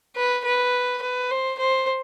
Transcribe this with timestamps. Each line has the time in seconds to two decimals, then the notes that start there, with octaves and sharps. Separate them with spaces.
0.16 B4
0.45 B4
1.02 B4
1.31 C5
1.58 C5